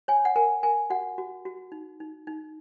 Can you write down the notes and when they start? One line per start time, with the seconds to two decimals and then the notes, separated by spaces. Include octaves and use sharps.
0.08 C#5 G#5
0.25 F#5
0.36 A#4 G#5
0.63 A#4 G#5
0.90 F#4 F#5
1.18 F#4
1.45 F#4
1.72 D#4
2.00 D#4
2.27 D#4